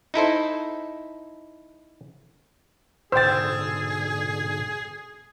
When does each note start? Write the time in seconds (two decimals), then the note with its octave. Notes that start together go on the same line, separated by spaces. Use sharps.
0.14 D#4 E4 A4 C5
3.12 G#2 B2 D3 G#4 C5 G5 E6 A6